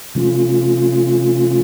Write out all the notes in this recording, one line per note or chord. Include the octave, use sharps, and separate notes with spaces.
C3 F3 A3 C#4 F4